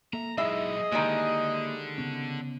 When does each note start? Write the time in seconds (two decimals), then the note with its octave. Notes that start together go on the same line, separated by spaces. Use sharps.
0.13 A#3 A4 E5 A#5
0.38 F#3 G#3 D#4 E4 G#4 D#5 E5 B5
0.92 D3 D#3 G3 G#3 A#3 E4
1.98 C#3 B3 C#4